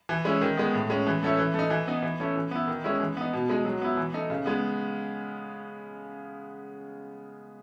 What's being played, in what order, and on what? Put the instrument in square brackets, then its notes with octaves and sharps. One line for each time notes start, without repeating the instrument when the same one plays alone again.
[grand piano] E3
G#3 C#4 E4
D#3
G#3 B3
A2
G#3 C#4
E3
A3 C#4 E4
E3
A3 D#4
E3
B3 D#4
E3
A3 C#4 E4
E3
B3 E4
D#3
G#3 C#4 E4
E3
B3 D#4
B2
G#3 D#4
F#3
B3 E4
E3
A3 D#4
C#3
G#3 B3